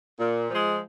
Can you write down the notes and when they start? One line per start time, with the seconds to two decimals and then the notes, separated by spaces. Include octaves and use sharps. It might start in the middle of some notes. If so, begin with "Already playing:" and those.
0.20 A#2
0.50 F3 G#3